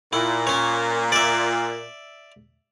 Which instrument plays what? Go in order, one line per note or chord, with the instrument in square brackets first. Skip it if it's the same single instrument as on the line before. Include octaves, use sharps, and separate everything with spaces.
[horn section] A#2 [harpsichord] E4
[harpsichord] C#4 C#5
D5 E5